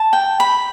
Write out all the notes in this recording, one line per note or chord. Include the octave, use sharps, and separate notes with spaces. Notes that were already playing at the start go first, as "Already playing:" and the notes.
Already playing: A5
G5
B5